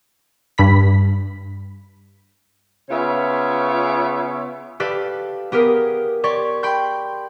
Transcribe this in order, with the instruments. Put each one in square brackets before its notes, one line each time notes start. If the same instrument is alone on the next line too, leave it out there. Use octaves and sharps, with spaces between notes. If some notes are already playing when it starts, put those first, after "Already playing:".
[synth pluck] G2 B5 B6
[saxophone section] C#3 B3 F4 C#5 E5
[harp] G4 A4 B4 D5 F5
B3 G4 G#4 A#4
G4 C#5 D5 C6 C#6
G5 B5 C6 G6